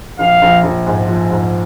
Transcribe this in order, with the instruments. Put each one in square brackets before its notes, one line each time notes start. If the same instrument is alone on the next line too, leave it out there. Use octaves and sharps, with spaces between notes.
[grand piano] A#1 [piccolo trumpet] F5
[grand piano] A#1
A#1
G#2
F3
G#2